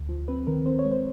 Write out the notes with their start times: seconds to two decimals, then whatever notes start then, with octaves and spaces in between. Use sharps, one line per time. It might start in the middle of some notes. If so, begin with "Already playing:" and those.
Already playing: D2
0.09 F3
0.28 C4 B4
0.47 D#3 A#4
0.66 C4 C5
0.79 C#5
0.84 G#3
0.92 C5